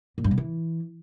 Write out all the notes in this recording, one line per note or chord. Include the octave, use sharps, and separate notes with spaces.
A#2
G2
B2
E3